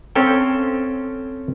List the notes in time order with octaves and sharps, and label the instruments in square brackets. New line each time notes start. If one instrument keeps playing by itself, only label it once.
[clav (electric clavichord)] C4 C#4 A4 F5 G5